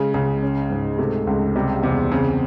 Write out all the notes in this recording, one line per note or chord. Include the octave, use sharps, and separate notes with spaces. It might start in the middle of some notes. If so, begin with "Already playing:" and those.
Already playing: C#3 G#3
C#2 C#3
C#4
G#2
C3 A3
C#2
C3 G3
E2 C3
C#3 C4